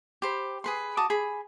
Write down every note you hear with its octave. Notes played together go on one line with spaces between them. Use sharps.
G4 C5 B5
G#4 B4 C6
F#4 A5 D6 D#6
G#4 B5